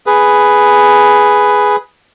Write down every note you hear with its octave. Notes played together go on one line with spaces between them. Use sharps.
G#4 B4